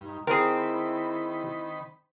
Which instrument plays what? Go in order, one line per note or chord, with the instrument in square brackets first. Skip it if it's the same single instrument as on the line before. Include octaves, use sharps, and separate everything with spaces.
[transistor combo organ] G2 [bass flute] D#4
[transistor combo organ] D#3 B5 [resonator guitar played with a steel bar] C4 [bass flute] E4 [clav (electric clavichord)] G#4 A#4